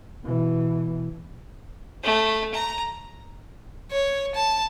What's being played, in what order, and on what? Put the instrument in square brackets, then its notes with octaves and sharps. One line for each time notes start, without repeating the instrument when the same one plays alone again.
[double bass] B2 E3
[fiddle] A3
A#5
[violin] C#5
A5